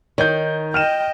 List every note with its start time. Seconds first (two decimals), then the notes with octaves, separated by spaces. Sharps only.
0.18 D#3 C#5 D#5 G6
0.74 D#5 G5 F6 D#7 E7